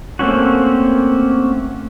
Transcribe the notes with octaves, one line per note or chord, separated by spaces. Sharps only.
A3 A#3 C4 C#4 F#4